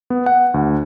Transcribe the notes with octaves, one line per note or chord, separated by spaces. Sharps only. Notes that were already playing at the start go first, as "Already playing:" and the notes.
B3
F#5
D2